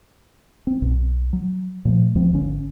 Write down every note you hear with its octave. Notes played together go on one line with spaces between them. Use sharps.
C4
B1 B2
F#3
A#2 F3 A3
D2 F3 G#3 C4
G#1 D3 C#4